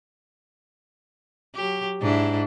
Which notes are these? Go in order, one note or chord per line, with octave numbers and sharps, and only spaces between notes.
F#3 G4
G#2 D4 E4